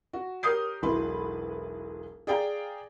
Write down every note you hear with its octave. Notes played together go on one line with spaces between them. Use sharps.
F#4
G4 A#4 C#5 D#6 G6 C7
E1 B1 F#3 E4 B4 C6
G#4 D5 F5 G5 G#5 A#5